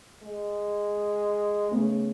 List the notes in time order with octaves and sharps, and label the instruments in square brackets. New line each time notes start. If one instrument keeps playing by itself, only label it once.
[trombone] G#3
[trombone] C#3 [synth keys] A3 B3